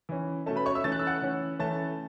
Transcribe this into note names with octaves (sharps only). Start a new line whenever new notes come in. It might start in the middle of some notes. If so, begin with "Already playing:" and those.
E3 C#4
B2 A3 C#4 A4 A5
B4 B5
C#5 C#6
E5 E6
E3 A3 C#4 A6
F#6
E6
F#5 F#6
E3 C#4
E3 A3 C#4 A5 A6